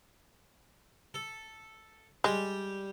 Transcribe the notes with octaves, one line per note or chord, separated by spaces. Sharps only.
A4
G3 G#3 G4